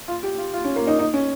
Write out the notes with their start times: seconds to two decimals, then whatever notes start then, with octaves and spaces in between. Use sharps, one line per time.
0.08 F4
0.23 G4
0.38 F4
0.54 F4
0.65 C#4
0.76 A#3
0.87 D#4
0.99 D#4
1.14 C#4